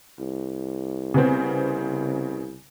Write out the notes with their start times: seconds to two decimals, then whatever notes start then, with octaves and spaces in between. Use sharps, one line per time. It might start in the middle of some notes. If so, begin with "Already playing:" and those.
0.19 C2
1.14 C#3 B3 C4